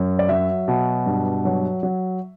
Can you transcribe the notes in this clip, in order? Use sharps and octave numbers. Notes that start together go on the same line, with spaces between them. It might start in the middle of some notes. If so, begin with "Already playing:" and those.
Already playing: F#2
D5
F#3 E5
B2
G2
F#3
F#3